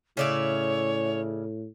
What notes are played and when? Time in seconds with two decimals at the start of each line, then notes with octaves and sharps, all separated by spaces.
0.17 A2 C#3 C#5 D5 E5